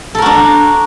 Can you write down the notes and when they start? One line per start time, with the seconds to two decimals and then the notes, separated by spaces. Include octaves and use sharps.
0.15 A4
0.18 A#4
0.22 F#4
0.26 D4